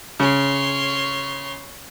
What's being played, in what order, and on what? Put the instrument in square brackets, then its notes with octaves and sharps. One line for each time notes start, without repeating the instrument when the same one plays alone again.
[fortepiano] C#3 [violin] C#5 C6